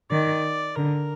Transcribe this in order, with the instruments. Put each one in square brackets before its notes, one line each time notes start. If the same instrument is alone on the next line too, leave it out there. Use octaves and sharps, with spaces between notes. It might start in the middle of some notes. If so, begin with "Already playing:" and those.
[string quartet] D#3 [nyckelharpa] D5
[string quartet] D3 [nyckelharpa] A#4